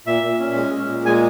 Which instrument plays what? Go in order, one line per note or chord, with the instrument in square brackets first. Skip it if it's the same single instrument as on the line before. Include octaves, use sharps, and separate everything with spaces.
[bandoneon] A#2 E5
A#2
C#4
G#3
G#3
A#2
G#3 G#5